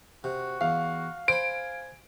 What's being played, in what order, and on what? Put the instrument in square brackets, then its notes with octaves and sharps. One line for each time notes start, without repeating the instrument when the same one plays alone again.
[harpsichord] C3 [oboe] F#4
[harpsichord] E2 [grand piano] F5
[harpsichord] C5 B5 [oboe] G#5 [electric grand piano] D7